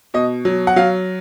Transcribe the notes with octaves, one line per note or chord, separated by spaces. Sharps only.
B2 D#5
F#3
F#5
F#3 F5